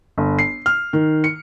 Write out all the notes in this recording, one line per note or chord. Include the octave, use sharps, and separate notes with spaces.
G1
C7
F6
D#3
C#7